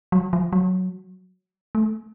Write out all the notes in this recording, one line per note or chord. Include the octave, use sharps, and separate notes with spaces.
F#3
F3
F#3
A3